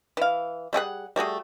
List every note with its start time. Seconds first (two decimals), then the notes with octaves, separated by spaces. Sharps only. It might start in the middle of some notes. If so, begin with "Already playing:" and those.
0.17 E3 F5
0.73 G3 A3 G#4 F#5
1.16 G3 A3 F#4 G#4